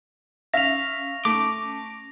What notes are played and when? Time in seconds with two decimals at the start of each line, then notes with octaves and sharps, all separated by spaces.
0.54 C#4 E5 F5 A#6 F7
1.25 A3 D6